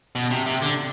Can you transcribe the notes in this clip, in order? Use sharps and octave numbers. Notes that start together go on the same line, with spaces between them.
B2
C3
C3
D3